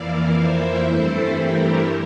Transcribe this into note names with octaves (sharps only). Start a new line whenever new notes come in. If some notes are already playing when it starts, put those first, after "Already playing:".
Already playing: F2 E3 A#3 E4 D5 F5
C5 E5
G2 E3 A3 C4 E4 A4 C5
G4 A#4